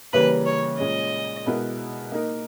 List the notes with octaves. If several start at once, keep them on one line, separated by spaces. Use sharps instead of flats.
C#3 E3 G3 A#3 C#4 B4
C#5
A#2 G#3 C#4 D#5
B2 G#3 B3 E4 A#4
A#3 D#4 A#4